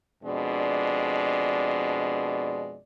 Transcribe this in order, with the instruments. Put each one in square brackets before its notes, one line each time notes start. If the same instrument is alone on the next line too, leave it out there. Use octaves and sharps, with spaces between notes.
[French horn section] F2 B2 G#3 D4 D5